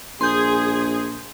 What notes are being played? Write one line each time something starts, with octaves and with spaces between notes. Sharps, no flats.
A#1 G#4 C6 G6